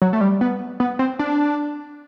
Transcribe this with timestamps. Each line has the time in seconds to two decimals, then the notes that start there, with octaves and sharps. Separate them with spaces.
0.02 F#3
0.13 A3
0.21 G3
0.41 B3
0.80 B3
0.99 C4
1.19 D4